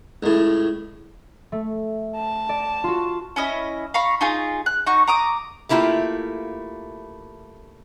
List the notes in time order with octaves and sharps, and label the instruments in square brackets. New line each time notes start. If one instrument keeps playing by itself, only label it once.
[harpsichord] C#2 A2
[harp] A3
[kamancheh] A5
[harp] D5
F4 F#4
[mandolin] C#4 E4 D#5
F5 A#5 B5 C#6
D#4 F4 G#4
F#6
D#4 F#4 C#6
A#5 D6 D#6
[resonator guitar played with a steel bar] A3 A#3 E4 F4 G4